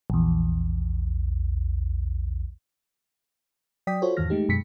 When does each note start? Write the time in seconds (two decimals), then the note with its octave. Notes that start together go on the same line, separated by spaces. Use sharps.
0.10 A#1 E2
3.87 F#3 D5 G5 D#6 B6
4.02 F4 F#4 A4 C5 C#5
4.17 E2 G#2 D#3 E3 F6 A#6
4.30 G#3 A3 D#4 G4
4.49 F#2 B2 G#3 B6 C#7